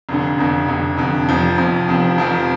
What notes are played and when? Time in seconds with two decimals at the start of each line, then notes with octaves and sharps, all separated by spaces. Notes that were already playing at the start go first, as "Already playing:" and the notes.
0.09 F1 F2 D3
0.38 F1 F2 D3
0.68 F1 F2 D3
0.98 F1 F2 D3
1.29 F1 F2 F3
1.58 F1 F2 F3
1.88 F1 F2 F3
2.18 F1 F2 F3